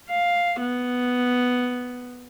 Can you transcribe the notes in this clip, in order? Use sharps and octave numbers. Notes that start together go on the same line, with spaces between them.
F5
B3